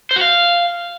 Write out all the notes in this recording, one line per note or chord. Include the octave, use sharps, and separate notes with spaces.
C5
F#4
F5